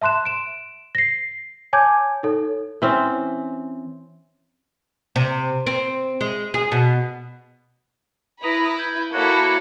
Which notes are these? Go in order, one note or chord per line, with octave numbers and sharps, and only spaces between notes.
E5 A5 C6 F#6 E7
D7 E7
A#6 C7
C#5 G#5 A5 D6 G6 G#6
D#4 A4 C#5
E3 C4 C#4
C3
C4
G#3
G#4
B2
E4 B4 A#5 B5 D#6
G6 G#6
A#3 E4 F#4 A4 C#5 F#5